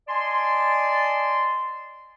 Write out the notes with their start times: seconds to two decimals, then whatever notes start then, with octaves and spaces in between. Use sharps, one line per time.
0.08 D5 D#5 G#5 A5 C6